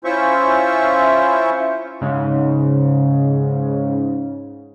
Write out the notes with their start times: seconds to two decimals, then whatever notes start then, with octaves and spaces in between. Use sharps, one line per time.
0.04 C#4 E4 F4 C5 E5 C#6
2.01 G#2 C#3